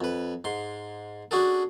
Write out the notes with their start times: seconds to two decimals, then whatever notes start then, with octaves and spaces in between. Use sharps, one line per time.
0.01 F2 B4
0.44 G#2 C6
1.31 C#4 D4 F#4 G#4 A4